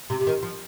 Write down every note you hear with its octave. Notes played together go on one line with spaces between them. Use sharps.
C3
C3
D#3
F3